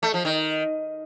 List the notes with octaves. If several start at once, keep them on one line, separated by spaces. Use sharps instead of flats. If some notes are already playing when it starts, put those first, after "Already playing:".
A3
F3
D#3